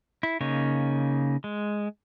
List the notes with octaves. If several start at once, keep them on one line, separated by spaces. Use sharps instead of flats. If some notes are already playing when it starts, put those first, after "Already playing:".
E4
C#3 A#3 D#4 C#5
G#3